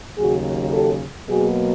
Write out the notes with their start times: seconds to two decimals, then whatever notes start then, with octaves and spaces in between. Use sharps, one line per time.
0.16 D#2 C#3 F#3 F#4 G#4
0.73 G4 A4
1.29 B2 F#3 A#3 F#4 G#4